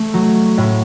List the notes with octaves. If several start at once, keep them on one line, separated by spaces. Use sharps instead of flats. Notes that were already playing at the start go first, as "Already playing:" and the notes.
Already playing: A3
F#3
A2